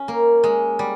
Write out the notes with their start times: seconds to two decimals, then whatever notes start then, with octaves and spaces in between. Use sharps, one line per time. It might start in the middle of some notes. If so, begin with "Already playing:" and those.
Already playing: C#4
0.08 A#3
0.44 G#3
0.79 G3